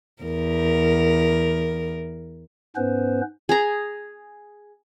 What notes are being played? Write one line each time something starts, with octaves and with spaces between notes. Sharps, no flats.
E2 A#4
G#2 B3 C#4 B4 C5
G#4 A#5